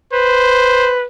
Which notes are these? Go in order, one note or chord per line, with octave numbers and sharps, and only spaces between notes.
B4 C5